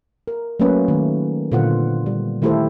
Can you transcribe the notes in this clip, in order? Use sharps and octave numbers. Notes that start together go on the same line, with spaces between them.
A#4
F#3 A3 A#3 C#4 B4
D#3 A3
A#2 D3 B3 F4 C5 F#5
G3
D#3 A3 E4 G4 A4 C5